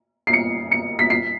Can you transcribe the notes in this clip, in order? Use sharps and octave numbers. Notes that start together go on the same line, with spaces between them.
C7
C#7
C#7
B6
C7